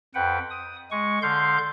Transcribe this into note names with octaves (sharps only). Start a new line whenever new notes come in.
F2 B4 F#5 G5
D#6
G#3 C#6
D3 F5 C6 G6